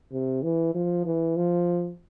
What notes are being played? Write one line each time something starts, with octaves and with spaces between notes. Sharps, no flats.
C3
E3
F3
E3
F3